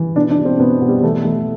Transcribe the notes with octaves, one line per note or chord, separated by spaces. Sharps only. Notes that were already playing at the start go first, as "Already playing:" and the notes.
Already playing: E3
B2 D4
D4
B2
C4
B2 B3
B2
G3
E3 A3
E3 A3